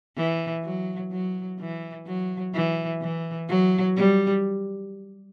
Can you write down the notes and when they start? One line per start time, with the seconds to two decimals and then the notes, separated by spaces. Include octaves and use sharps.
0.16 E3
0.64 F#3
1.11 F#3
1.60 E3
2.06 F#3
2.54 E3
3.01 E3
3.48 F#3
3.96 G3